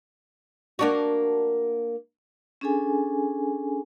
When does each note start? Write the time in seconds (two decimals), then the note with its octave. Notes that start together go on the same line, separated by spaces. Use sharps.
0.79 A#3 D4 F#4
2.61 C#4 D4 G#4 A4 G#5